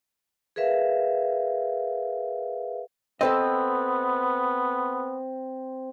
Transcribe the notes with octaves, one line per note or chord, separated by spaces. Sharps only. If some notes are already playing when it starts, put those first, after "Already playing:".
G#4 A#4 B4 E5 F5
B3 C4 A4 B4 D#5